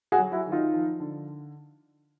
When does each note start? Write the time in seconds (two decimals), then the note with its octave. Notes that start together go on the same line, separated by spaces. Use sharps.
0.12 F#4 G#4
0.18 F#3
0.32 E4 F#4
0.46 D#3
0.52 D#4 F4
0.73 F3
1.00 D3